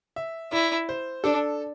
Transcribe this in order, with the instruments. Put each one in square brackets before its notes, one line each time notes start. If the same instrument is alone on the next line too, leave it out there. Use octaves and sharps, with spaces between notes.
[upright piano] E5
[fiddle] E4 [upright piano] D5
[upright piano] C5
[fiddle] D4 [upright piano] A4